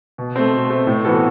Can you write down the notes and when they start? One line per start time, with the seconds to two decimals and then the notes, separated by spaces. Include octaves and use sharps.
0.18 B2
0.36 A3 C4
0.53 B2
0.70 A3 C4
0.87 A2
1.04 E3 B3 F#4 A4